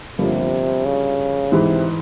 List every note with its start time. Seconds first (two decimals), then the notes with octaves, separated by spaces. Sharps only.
0.18 G1 G2 C3 F3 A#3
0.85 C#3
1.52 G#2 C3 E3 G#3